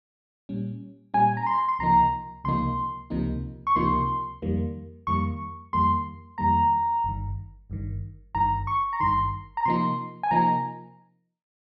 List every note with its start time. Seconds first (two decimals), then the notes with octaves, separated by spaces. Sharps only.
0.49 A#2 G3 C#4
1.14 A#2 G3 C#4 G#5
1.37 A#5
1.47 C6
1.69 C6
1.79 C#2 C3 F3 A#3 D#4 A#5
2.44 C#2 C3 F3 A#3 D#4 C6
3.10 C#2 C3 F3 A#3 D#4
3.67 C#6
3.76 C#2 C3 F3 A#3 D#4 C6
4.42 F2 D#3 G3 A#3
5.07 F2 D#3 G3 A#3 C#6
5.73 F2 D#3 G3 A#3 C6
6.38 F2 D#3 G3 A#3 A#5
7.04 G1 G2 D#3
7.70 G1 G2 D#3
8.35 G1 G2 D#3 A#5
8.67 C#6
8.93 A#5
9.00 G1 G2 D#3 C6
9.57 A#5
9.65 C3 F3 A#3 D#4 C6
10.23 G#5
10.31 C3 F3 A#3 D#4 A#5